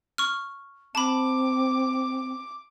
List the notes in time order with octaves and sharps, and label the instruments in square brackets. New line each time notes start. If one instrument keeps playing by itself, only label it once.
[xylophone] C#6 F6
[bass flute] C4 [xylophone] A5 B5 [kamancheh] D6